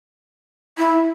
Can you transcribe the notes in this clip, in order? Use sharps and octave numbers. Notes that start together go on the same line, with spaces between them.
E4